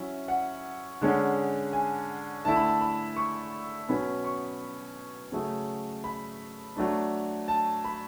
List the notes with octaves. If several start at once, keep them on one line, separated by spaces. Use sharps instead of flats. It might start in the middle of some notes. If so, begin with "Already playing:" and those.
Already playing: F#3 C#4 E4 E5
F#5
D3 G#3 C#4
G#5
D3 A3 E4 A5
B5
A5
B5
C#6
B2 F#3 C#4 B5
C#6
C#3 F#3 A3
B5
F#3 A3 D4
A5
B5